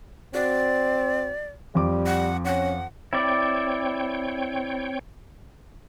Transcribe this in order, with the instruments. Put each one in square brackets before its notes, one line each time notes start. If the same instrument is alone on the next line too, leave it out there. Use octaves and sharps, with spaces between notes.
[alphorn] C4 [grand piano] F#4 [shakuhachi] D5
[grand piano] F2 D6 [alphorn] G3
[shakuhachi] F#5
[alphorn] C#4 [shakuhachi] F#5
[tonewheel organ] C4 C#5 G5 [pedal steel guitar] E4 D5